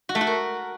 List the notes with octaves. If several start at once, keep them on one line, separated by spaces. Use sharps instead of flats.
F#4
A3
F#4
A#4